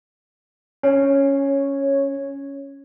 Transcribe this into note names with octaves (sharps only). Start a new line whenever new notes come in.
C#4 C#5